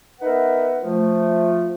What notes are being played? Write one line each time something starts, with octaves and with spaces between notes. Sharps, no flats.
B3 D#4 A#4 B4 E5 F#5
F3 A3